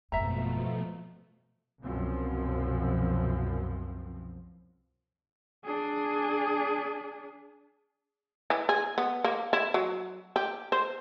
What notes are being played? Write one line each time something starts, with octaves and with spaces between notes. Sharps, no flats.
G#1 F#2 B2 F3 A3 E5 A#5
C2 F#2 B2 F3 C4
D4 G#4
E3
G#4
B3
A#3
E4
F#3
G4
C5